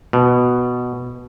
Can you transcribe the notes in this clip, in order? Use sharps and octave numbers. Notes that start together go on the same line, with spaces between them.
B2